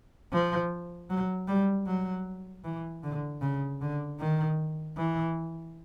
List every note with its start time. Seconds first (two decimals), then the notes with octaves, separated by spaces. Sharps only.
0.33 F3
1.10 F#3
1.48 G3
1.87 F#3
2.64 E3
3.03 D3
3.42 C#3
3.81 D3
4.20 D#3
4.97 E3